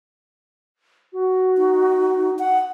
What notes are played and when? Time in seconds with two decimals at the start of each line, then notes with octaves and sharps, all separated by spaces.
1.13 F#4
1.57 D#4
2.39 F#5